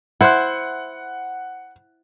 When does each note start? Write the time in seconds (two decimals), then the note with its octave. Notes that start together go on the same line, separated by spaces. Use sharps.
0.21 E4 C5 F#5 F#6